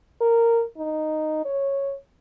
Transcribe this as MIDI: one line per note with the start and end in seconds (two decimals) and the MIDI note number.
0.21 0.63 70
0.77 1.41 63
1.45 1.93 73